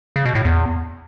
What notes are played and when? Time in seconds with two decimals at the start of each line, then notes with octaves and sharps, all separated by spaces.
0.16 C#3
0.25 B2
0.35 A2
0.45 E2